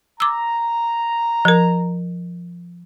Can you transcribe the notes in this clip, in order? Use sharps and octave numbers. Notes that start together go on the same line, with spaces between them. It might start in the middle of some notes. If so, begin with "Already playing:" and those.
A#5 D6 E6
F3 A#4